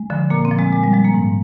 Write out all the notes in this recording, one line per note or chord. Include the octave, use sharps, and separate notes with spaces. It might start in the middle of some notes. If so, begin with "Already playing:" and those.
Already playing: G#3
D3 F3
A#2 A#3
C4
F3
G#3
A#2 G#3
G3
F3 G#3
A#3
G#2